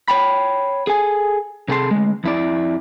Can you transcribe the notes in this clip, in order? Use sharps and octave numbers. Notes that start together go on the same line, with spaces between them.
C#5 G5 B5
G#4 A4 G#5
C3 G#4 A4 F#5 C6
D2 G#3
F2 E4 D5